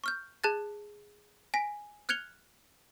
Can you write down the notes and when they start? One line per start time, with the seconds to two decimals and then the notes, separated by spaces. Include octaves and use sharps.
0.04 C#6 F6 G6
0.44 G#4 A5 F#6 G#6 A6
1.54 G#5 A#6 B6 D7
2.09 F6 F#6 G#6 C#7 F7 G7